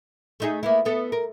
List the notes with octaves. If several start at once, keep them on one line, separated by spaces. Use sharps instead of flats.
A3 D#4 G#4
A#3 B3 E4
B3 A4
A#4